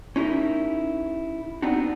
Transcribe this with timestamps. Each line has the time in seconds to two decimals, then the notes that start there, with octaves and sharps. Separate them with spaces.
0.16 C#4 D#4 E4 G4 A#4
1.62 B3 C4 D4 D#4 F#4